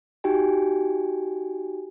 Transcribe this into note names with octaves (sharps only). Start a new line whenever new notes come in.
D#4 F#4 G4 G5 G#5